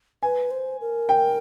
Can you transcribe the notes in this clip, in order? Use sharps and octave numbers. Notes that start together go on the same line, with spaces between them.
B4 G#5
C5
A#4
G5